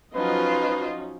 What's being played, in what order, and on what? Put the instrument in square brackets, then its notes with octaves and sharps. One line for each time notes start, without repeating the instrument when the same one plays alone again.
[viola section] F3 F#3 D#5 [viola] C#4 D#4 [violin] F4 C5 [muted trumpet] B4